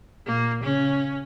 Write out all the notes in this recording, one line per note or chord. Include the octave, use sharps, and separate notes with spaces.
A#2 A#3
C#3 C#4